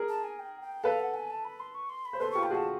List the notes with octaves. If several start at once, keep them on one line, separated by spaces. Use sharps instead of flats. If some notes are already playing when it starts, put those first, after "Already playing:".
Already playing: G#4 A#4
A5
G#5
G5
G5
A4 B4 F5
F#5
G#5
A5
B5
C6
C#6
C6
B5
C5
A4 B4 C6
F4 G4 C#6
G5
F#4 G#4 A5